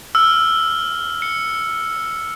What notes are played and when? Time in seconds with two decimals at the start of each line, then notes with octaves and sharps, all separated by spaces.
0.15 E6 F6
1.22 C#7